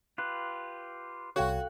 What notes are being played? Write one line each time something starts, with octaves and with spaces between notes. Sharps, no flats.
F4 G4 B4 F#6
C2 F#4 A4 C#5 F5 G5